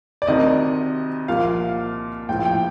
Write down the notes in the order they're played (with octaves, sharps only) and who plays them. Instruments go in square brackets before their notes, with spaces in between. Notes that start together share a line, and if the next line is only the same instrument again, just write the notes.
[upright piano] D5
D2 C3 D#3 D#5
C2 A#2 F3 F5
A#1 A2 F3 G5
G5